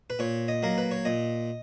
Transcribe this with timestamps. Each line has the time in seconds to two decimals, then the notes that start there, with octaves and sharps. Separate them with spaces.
0.10 B4
0.19 A#2 C#5
0.48 D#5
0.63 F#3 A#3 A#4
0.78 B4
0.91 C#5
1.05 A#2 D#5